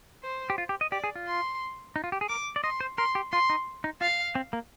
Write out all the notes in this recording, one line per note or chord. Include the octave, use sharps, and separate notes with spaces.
C5
G4
F4
G4
D#5
G4 D5
G#4
F4
C6
D#4
F4
G4
G#4
A#4 D6
D5
D#5 C6
C5
A#4 C6
G4
F4 C6
D#4
D#4
F4 F5
C4
A#3